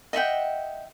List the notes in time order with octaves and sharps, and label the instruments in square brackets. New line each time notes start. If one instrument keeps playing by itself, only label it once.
[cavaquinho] D#5 E5 F#5 G5